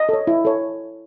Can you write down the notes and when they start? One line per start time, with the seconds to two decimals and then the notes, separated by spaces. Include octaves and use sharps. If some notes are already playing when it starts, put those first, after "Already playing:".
Already playing: D#5
0.09 A4 C#5
0.27 E4
0.45 A4 C#5